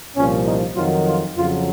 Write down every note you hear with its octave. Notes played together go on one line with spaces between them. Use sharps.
C2 A#2 F3 C#4
D#4
F2 D#3 F#3 F4
F4
F2 C#3 F#3 F4